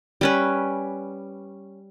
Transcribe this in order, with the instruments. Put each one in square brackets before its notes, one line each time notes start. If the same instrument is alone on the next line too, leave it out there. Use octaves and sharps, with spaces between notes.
[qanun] G3 C#4 B4